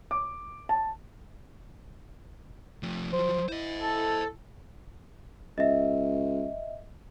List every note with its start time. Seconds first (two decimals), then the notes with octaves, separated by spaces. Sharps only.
0.11 D6
0.69 A5
2.83 F3 A3
3.13 F3 F#3 C5
3.49 E4 C5 D#5
3.80 A4
5.58 C#2 D#5 E5